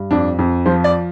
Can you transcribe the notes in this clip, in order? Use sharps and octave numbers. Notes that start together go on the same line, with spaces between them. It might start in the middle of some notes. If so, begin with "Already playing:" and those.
Already playing: G2
F2 D4
F2
F3 C5
D5